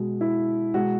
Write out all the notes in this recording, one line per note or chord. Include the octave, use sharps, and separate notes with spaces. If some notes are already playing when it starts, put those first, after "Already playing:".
Already playing: B2 G#3
E4
B2 G#3 F#4